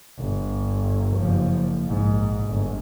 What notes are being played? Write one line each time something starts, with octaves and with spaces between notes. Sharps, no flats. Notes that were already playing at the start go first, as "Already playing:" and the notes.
G1
F#1 F3
A#1 G#2
G1